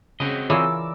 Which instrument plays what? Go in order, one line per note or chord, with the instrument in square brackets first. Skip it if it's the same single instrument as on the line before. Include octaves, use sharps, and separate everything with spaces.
[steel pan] C#3 [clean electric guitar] C4 F#4 D#5
[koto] E3 [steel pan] F4 G#4 C#5 [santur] A#4 D5 E6